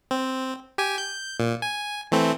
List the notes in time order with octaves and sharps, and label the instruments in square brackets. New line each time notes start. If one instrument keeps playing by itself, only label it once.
[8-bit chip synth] C4
G4 G#5
G6
A#2
G#5
E3 A3 C4